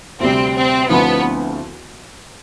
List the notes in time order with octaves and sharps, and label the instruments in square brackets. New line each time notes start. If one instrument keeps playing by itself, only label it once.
[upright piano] D2 C3 G3 [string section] C4
[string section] C4
[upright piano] D2 D3 F3 C4 E4 [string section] B3